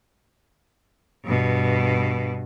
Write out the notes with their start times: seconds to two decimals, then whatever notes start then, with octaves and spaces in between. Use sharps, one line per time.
1.24 G2 B2